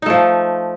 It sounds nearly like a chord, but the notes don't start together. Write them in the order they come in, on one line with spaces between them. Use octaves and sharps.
D#4 A3 F3